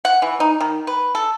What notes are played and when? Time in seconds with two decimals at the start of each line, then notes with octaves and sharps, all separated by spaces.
0.05 F#5
0.22 E3
0.40 D#4
0.61 D#3
0.87 B4
1.15 A4